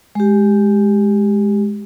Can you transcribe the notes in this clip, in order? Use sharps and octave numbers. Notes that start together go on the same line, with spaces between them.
G#3 G4